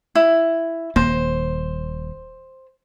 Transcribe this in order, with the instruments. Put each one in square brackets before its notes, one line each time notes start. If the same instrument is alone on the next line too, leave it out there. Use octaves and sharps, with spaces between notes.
[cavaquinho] E4
[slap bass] D#1 A#3 [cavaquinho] C5